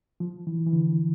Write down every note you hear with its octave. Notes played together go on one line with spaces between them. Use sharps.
F3
E3
E3
D3